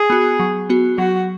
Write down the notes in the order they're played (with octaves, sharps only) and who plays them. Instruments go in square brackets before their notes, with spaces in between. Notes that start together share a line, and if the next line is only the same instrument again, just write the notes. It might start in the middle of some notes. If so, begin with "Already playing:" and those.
Already playing: [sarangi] G#4
[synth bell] B3 F#4
F#3
B3 F#4
[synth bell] F#3 [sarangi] F#4